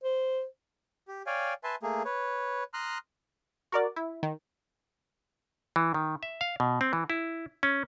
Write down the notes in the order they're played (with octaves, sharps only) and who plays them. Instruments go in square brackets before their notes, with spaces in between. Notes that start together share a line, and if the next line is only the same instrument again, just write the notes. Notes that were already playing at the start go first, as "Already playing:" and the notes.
[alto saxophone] C5
[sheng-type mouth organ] G4
C#5 D5 F5 G5 G#5
B4 E5 G#5 A5 C6
A3 A#3 G#4
B4 C#5
A#5 C6 D#6 F6 F#6
[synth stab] F#4 A#4 D5
E4
D#3
[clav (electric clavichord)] E3
D#3
E5
F5
B2
C4
E3
E4
C#4